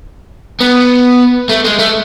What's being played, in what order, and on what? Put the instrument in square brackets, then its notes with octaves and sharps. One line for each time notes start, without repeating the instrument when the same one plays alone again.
[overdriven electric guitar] B3
A3
G#3
A3